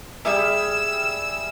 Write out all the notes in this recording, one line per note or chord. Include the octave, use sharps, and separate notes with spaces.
G3 G#4 E5 E6